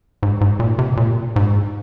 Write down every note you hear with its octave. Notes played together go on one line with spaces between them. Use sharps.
G#2
G#2
A#2
C3
A#2
G#2